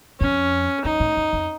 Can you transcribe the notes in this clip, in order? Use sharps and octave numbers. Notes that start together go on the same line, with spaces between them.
F2 C#4
F#2 D#4
A2
F2
F2